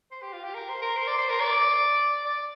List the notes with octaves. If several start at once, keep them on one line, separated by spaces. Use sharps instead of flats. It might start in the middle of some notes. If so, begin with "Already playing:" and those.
C5
G4
F4
G4
A#4
C5
A#4
C5
D5
C5
A#4
D5
D5